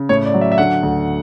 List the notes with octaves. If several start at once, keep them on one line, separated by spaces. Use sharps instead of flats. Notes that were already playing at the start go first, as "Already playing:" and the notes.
Already playing: C#3
A2 C#5
D5
F#3
E5
E5
D3 F#5
D2